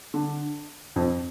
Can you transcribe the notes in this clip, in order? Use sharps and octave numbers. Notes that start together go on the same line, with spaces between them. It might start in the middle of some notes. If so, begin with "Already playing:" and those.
D3
F2